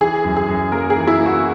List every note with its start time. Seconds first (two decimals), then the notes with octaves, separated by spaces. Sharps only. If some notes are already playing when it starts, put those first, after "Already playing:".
0.01 E3 G#4
0.24 F#2
0.37 G#4
0.48 F#2
0.72 A#3 A#4
0.90 G#4
0.96 E3
1.07 E4
1.20 A#3
1.26 F#4